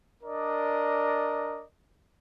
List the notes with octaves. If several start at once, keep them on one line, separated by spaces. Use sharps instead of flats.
D4 A#4 D5 D#5